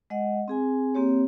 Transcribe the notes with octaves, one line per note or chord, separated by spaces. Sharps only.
G#3 D#5 F#5
C4 G#4 G#5
A#3 C4 G4 C#5